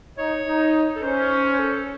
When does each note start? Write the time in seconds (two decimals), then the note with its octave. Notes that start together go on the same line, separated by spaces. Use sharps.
0.18 D#4 C#5
0.46 D#4
0.95 A4
1.02 C#4 C5
1.53 C5
1.59 A4